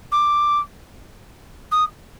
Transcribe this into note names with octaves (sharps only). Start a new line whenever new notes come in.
D6
D#6